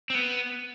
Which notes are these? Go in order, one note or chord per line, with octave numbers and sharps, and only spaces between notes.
C4
B3